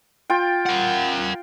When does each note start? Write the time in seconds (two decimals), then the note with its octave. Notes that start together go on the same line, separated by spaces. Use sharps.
0.30 F4 G5
0.66 A#4 F#5